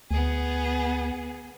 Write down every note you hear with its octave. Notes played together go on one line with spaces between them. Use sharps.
D2 B3 G#4